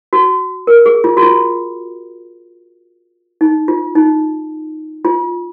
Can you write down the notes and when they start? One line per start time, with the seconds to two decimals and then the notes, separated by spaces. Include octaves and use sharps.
0.13 F#4
0.67 A#4
0.86 G#4
1.04 F4
1.17 F#4
1.22 F4
3.41 D#4
3.68 F4
3.95 D#4
5.05 F4